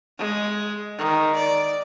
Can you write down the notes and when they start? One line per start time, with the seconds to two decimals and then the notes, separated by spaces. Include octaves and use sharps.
0.18 G#3
0.98 D#3
1.35 D5